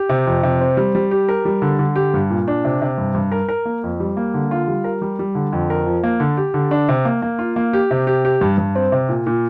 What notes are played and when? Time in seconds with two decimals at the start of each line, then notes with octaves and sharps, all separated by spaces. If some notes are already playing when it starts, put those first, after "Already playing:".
Already playing: G4
0.09 C3
0.26 F2
0.43 C3
0.61 C4
0.77 G3
0.95 G3
1.11 G4
1.29 A#4
1.45 G3
1.62 D3
1.79 D3
1.96 G4
2.14 G2
2.30 A#2
2.48 D4
2.64 C3
2.82 C3
2.98 G2
3.15 G2
3.32 A#4
3.49 A#4
3.65 A#3
3.83 F2
4.00 G3
4.17 A#3
4.34 D3
4.51 F4
4.68 G3
4.84 A#4
5.02 G3
5.19 G3
5.35 D3
5.52 F2
5.70 A#4
5.86 F3
6.03 A#3
6.20 D3
6.37 G4
6.54 D3
6.71 D4
6.89 C3
7.05 A#3
7.22 A#3
7.39 F4
7.56 A#3
7.73 G4
7.91 C3
8.07 G4
8.25 G4
8.41 G2
8.58 G2
8.75 C4
8.92 C3
9.09 A#2
9.26 A#2